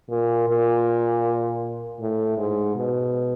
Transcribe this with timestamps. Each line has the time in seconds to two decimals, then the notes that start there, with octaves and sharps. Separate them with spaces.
0.10 A#2
0.48 A#2
2.00 A2
2.38 G#2
2.76 B2